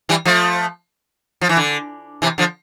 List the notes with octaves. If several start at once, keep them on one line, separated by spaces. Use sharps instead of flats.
E3 G3
F3 A3
F3
E3
D3
C3 E3
D3 F3